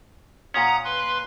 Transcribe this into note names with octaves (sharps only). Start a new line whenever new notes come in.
A#2 C#4 F#5 A#5 D#6
B4 C6